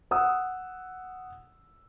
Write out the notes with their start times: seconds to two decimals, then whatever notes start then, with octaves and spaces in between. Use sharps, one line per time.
0.11 F#5 D#6 E6